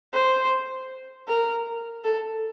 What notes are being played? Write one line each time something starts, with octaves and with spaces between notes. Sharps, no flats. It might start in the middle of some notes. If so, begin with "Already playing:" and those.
C5
A#4
A4